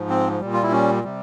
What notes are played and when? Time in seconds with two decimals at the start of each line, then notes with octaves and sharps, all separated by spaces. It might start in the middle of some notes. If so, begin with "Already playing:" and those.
Already playing: G#2 F3
0.10 C4
0.41 A#2 G3
0.53 F4
0.63 E4
0.72 C#4
1.04 C3 G3